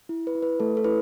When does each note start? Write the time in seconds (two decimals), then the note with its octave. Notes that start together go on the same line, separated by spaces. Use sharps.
0.09 E4
0.27 B4
0.35 E4
0.43 B4
0.60 A3 A4
0.77 A4
0.84 E4 B4